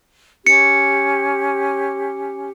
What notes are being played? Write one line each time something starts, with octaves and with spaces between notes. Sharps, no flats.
C#4 G4 C#7